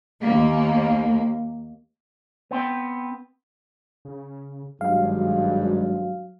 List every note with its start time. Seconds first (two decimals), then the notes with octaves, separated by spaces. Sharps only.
0.20 D#2 A#3
2.51 B3 C4 G5
4.05 C#3
4.81 G#1 G2 F#3 G#3 F5